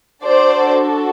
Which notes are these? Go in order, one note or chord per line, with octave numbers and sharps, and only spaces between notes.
D4 F#4 A4 C5 D5